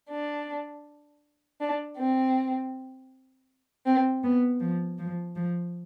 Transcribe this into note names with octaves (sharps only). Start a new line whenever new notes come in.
D4
D4
C4
C4
B3
F3
F3
F3